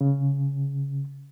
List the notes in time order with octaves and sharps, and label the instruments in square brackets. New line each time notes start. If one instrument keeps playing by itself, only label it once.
[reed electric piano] C#3